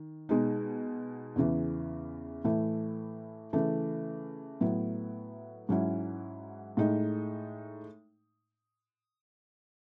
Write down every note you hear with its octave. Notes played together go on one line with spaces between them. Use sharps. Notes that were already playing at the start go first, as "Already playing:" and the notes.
Already playing: D#3
B2 G#3 D#4
E2 C#3 E3
A2 E3 A3 E4
C#3 E3 A3
A2 F#3 B3 E4
G#2 F#3 C#4 E4
A2 G#3 D#4